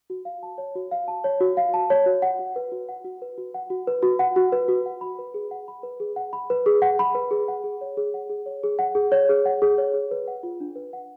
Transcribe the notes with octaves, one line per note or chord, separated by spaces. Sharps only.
F#4
F5
A5
C#5
F#4
F5
A5
C#5
F#4
F5
A5
C#5
F#4
F#5
F#4
B4
F#4
F#5
F#4
B4
F#4
F#5
F#4
B4
F#4
F#5
F#4
B4
F#4
F#5
B5
B4
G#4
F#5
B5
B4
G#4
F#5
B5
B4
G#4
F#5
B5
B4
G#4
F#5
G#4
C#5
G#4
F#5
G#4
C#5
G#4
F#5
G#4
C#5
G#4
F#5
G#4
C#5
G#4
B4
F#5
F4
D4
B4
F#5